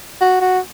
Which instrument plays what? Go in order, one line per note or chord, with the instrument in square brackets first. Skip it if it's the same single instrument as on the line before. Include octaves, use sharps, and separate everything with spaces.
[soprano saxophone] F#4
F#4